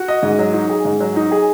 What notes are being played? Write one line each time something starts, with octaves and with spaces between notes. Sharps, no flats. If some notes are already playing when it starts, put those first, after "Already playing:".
Already playing: F#4
D#5
G#2
F#3
D#4
G#4
G#2
F#3
D#4
G#4